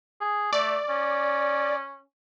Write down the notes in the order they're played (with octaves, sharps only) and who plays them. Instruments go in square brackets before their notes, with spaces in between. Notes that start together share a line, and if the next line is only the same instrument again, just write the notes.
[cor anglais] G#4
[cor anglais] A3 [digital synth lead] D5
[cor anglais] C#4